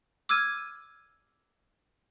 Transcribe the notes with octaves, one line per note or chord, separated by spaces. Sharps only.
D6 E6 F6 G#6 D#7